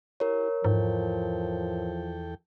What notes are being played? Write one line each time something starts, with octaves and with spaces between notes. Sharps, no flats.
E4 G4 A#4 C#5
E2 G#2 F3 A4 G5